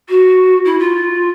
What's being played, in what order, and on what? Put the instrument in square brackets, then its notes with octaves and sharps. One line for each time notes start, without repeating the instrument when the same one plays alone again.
[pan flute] F#4
E4
F4